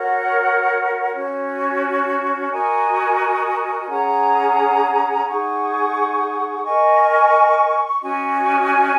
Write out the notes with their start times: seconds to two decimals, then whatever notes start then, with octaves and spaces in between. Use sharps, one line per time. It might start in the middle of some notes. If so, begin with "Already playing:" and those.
Already playing: F#4 A#4 C#5 F#5
1.14 C#4 F#4 C#5
2.52 F#4 A#4 D#5 G#5
3.89 C#4 G#4 F#5 A#5
5.27 D#4 G#4 F#5 C#6
6.64 A#4 D#5 G#5 C#6
8.02 C#4 F#4 D#5 G#5